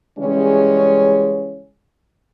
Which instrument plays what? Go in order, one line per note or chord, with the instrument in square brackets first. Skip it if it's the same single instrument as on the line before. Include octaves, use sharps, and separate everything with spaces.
[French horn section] C#3 E3 G3 G#3 C#4